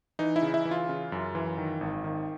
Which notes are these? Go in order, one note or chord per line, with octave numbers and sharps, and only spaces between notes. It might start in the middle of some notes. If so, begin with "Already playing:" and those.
E3 D#4
E4
C#3
E4
E3
F4
C#3
F#2
E3
D#3
G#1
D#3